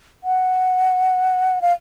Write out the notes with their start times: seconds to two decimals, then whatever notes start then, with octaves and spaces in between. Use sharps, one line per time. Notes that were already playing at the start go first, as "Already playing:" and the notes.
0.24 F#5
1.62 F5